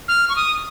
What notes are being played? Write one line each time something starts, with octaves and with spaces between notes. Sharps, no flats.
F6
C#6
D#6